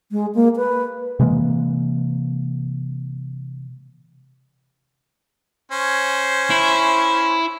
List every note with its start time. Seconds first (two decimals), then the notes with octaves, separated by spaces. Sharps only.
0.12 G#3
0.35 A#3
0.57 B4
1.19 C3 E3 G#3 A#3
5.72 C#4 C5
6.50 E4